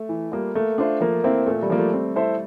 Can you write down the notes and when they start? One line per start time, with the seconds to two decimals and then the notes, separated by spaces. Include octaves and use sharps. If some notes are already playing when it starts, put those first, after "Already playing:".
Already playing: A3
0.09 E3
0.32 G3 A#3 F4
0.55 A3 A#3
0.78 D4 F4 C5 E5
1.01 F3 A#3
1.24 A#3 C4 E4
1.47 A#2 A3
1.63 G3
1.70 F3 A#3
1.78 A3
1.93 C4
2.16 E4 A4 C5 E5